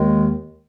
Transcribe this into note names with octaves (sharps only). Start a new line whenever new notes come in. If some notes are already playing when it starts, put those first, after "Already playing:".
Already playing: D#2 D#3 G#3